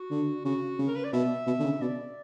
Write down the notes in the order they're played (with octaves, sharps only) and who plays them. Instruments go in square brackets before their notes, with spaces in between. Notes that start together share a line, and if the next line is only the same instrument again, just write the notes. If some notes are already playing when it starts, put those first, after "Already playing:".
Already playing: [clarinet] F#4
[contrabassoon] D3
[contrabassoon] C#3 [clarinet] F#4
[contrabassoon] C#3
[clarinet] A#4
B4
D5
[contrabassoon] B2 [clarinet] E5
[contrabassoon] B2
D3
C#3
[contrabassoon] B2 [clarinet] D5